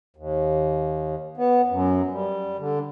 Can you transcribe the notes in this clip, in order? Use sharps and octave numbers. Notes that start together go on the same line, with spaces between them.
D#2
B3
F#2
G3
D3